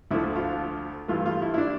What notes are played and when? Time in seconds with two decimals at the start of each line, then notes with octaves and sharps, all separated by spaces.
0.11 D2 D3 F3 A3 E4
0.36 F4
1.08 G2 E3 A3 F4
1.26 F4
1.42 E4
1.54 E4
1.58 D4